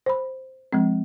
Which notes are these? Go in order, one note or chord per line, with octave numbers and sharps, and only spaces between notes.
C5 B5
F3 G#3 C4